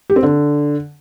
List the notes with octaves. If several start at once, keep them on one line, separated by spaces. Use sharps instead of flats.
G4
C4
D3